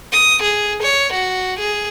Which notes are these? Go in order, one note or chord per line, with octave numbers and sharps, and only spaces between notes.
D#6
G#4
C#5
F#4
G#4